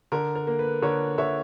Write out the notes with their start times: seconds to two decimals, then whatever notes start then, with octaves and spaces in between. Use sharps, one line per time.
0.12 D3 A#4
0.35 A#4
0.47 A#3
0.59 B4
0.83 D3 A#4 C#5
1.18 D3 C#5 E5